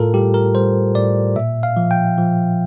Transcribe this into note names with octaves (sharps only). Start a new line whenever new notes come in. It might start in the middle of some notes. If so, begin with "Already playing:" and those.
Already playing: A2 F4 A4 A#4
G3 G4
A#4
G3 C5
A2 D5
A#2 E5
F5
F3
G5
F3